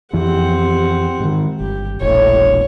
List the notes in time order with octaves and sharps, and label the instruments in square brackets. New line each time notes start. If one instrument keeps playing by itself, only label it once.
[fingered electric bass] F2 E3 F3 [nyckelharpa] C4 F#5 [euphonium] G4
[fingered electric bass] G#2 D#3
[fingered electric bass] G1 [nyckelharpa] G4
[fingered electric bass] E1 A#1 [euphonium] A2 [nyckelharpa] C#5